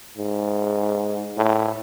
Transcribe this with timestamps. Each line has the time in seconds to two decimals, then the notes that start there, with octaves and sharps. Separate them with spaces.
0.17 G#2
1.37 A2